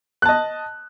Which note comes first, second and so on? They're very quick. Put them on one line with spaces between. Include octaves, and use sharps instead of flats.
F#6 A5 D#5